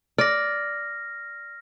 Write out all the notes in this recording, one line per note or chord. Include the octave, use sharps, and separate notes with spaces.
D5 F6 A#6